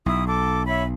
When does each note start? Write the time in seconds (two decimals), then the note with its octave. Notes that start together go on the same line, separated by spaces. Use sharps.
0.06 B1 E4 D#6
0.27 A4 D6
0.67 C#5 E5 B5